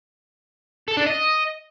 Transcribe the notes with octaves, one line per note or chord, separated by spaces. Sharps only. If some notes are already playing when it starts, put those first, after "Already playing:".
A4
D4
D#5